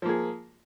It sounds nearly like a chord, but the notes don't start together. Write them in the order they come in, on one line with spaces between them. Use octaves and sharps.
F3 A#3 G#4